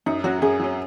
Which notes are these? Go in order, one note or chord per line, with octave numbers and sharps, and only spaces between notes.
F#2 D#4
F#3 C#4 F#4
F#2 G#4
F#3 C#4